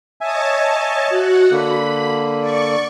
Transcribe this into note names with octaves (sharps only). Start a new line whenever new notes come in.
C#5 D#5 E5 G#5 A5
F#4 F#5
D3 A#3 B5
D5 C#6